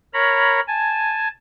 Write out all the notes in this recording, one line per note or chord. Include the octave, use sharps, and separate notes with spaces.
A#4 C#5 A#5 B5
G#5 A5